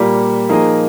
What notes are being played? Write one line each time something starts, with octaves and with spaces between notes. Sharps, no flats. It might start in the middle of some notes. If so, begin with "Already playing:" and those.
Already playing: A#2 G3 A#3
F3 A#3 D#4 G#4 D#5